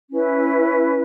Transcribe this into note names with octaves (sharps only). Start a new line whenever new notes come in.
C#4 E4 B4